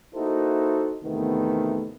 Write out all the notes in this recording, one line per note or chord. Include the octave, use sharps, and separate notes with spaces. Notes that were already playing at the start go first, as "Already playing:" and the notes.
A#3 D#4 E4 F#4 A4 C5
E2 C3 D#3 A3 B3